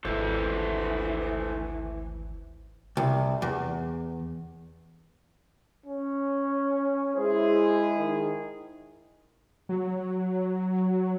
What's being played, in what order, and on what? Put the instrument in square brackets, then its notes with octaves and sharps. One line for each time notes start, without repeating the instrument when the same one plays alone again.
[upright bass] G#1 D2 [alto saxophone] E3 [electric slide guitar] A3 A4 C5
[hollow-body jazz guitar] C2
E2
[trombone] C#4
[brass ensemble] G#3 E4 G#4 [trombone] C5
[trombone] D#3
[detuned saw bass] F#3